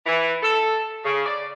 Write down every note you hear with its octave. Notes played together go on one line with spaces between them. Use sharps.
E3
A4
C#3
D5